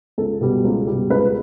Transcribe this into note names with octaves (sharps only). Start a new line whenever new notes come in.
C#2 A4
B2 G3
C#2
B2 G3
C#2 B4